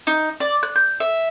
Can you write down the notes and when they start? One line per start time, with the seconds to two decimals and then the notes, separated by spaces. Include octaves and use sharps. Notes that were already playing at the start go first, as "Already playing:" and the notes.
0.07 D#4
0.40 D5
0.63 F#6
0.76 G6
1.00 E5